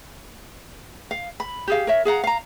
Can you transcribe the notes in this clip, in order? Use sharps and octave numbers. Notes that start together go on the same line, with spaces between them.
F5
B5
G4 G#4 F5
A#4 C#5 E5
G#4 F5 F#5 A#5
F5 A#5